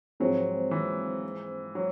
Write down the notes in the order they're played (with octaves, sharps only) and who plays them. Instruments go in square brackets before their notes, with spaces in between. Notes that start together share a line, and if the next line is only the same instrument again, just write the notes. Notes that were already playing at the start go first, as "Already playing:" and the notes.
[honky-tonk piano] G#2 F3 G#3 C4 [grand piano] F#3
[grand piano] E3
F#3